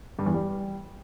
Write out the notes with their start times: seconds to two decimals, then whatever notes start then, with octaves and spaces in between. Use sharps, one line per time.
0.19 G2
0.26 E2
0.34 G3